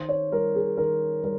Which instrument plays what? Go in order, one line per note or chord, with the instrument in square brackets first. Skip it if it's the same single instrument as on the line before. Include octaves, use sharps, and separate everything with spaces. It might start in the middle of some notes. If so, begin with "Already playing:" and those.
Already playing: [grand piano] D#3 C5
C#5
G3 A#4
G#4
D#3 A#4
G3 A#4